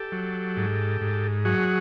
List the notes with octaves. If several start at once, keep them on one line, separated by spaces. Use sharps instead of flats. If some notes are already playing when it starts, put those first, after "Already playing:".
Already playing: G4 A4
F#3
G#2
G#2
F#3 F#4 G#4